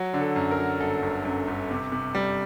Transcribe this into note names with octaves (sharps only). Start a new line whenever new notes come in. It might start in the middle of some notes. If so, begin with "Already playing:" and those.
Already playing: F#3
D3
A4
F#2
A#4
F#3
G1 A4
G1
F#2
G1
C3
C3
G3